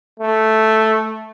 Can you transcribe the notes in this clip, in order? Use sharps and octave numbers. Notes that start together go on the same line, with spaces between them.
A3